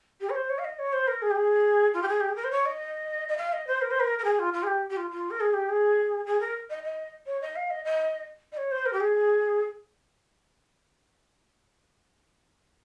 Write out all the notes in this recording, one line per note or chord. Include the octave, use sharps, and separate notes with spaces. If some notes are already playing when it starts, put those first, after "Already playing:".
G4
C#5
C5
C#5
F5
D#5
C#5
C5
A#4
G#4
G4
G#4
F4
G4
G#4
G4
G#4
A#4
C5
C#5
D#5
D#5
F5
D#5
C5
A#4
C5
A#4
A#4
G#4
F4
F4
G#4
G4
G4
F4
F4
A#4
G#4
G4
G#4
G#4
A#4
D#5
D#5
C#5
D#5
F5
D#5
D#5
D#5
C#5
C5
A#4
G4
G#4